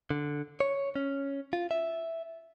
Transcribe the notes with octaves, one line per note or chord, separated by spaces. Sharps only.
D3
C#5
C#4
F4
E5